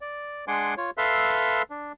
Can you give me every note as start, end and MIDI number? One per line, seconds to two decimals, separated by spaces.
0.01 0.45 74
0.48 0.74 56
0.48 0.74 62
0.48 0.74 78
0.48 0.74 80
0.48 0.74 84
0.48 0.74 86
0.77 0.91 65
0.77 0.91 73
0.98 1.62 69
0.98 1.62 71
0.98 1.62 76
0.98 1.62 77
0.98 1.62 84
1.70 1.92 62